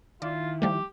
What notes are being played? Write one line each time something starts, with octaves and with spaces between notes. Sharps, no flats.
D#3 E4 F4 D5
F3 G3 A3 G4